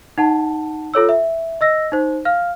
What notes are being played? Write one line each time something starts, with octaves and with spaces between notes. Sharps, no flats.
D#4 F#5 A5
F4 A4 C#5 E6
E5
D#5 E6 A#6
D#4 C5
F5 F6